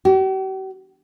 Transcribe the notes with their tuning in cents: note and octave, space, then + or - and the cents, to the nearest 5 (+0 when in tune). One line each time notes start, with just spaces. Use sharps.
G4 -45